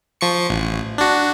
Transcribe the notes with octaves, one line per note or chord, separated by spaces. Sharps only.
F3 C#6 C#7
A1
D4 F#4